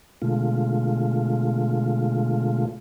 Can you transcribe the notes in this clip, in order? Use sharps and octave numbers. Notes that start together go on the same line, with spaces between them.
B2 D3 G#3 A3 F4